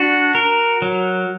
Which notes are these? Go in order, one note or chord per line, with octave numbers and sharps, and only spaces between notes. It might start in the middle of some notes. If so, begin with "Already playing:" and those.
Already playing: D4 F#4
A#4
F#3